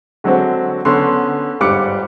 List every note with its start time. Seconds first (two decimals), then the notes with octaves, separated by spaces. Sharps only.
0.24 D3 F#3 G#3 C4 F#4
0.85 D3 B3 C#4 C6
1.60 G1 G#2 G3 D6 F#6 C#7